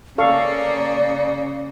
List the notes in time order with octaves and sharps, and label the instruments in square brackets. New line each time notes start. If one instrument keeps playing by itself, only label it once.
[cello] C#3 A#3 [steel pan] A4 F5 C#6 [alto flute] D5